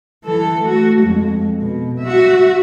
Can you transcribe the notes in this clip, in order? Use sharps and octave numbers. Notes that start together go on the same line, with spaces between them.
E3 A4
A3 F#4
F2 G#3
B2
F#4 E5